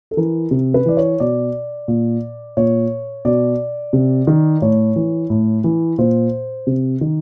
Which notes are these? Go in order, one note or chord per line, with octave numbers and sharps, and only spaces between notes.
A4
E3 A#4
C3
B4
E3 D5
C#5
B2 D5
A#2
A#2 C#5
B2 D5
C3
D#3
A2 C#5
E3
A2
E3
A#2 C5
C3
D#3